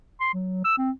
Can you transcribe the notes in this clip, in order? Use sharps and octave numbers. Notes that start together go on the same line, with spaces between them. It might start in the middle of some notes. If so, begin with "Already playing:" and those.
C6
F#3
E6
C4